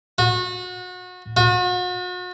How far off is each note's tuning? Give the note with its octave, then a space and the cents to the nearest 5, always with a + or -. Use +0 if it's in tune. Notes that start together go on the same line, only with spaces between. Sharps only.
F#4 -30
F#4 -40